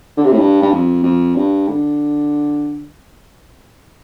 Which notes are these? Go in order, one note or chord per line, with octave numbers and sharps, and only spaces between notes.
D3
C3
A2
G2
G2
F2
F2
G2
D3